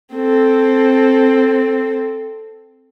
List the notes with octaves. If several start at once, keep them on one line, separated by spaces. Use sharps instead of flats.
C4 A4